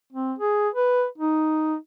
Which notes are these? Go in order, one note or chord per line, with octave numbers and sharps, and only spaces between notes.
C4
G#4
B4
D#4